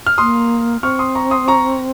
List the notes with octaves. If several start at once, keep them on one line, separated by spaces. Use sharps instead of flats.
F6
A#3 C6 D#6
C4 C#6 F6
C6 D#6
A#5 C#6
C6 D#6
A#5 C#6